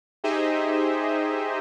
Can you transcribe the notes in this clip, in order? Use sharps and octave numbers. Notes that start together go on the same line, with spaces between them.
D#4 G4 G#4 C5 D#5 E5